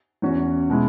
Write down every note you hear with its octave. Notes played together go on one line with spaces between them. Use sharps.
E2 E3 C#4 F#4
B2 G#3 E4